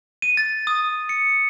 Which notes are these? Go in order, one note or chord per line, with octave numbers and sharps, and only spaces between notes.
D#7
A6
D#6
C#7